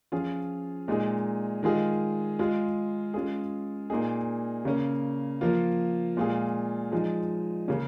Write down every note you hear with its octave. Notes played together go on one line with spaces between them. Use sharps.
F3 C#4 F4 G#4
A#2 G#3 D#4 G#4
D#3 G#3 F4 G#4
G#3 F4 G#4
G#3 C#4 F4 G#4
A#2 A#3 D#4 G#4
C#3 A#3 C#4
F3 A#3 F4
A#2 G#3 F4 G#4
F3 G#3 D#4 G#4
C#3 A#3 C#4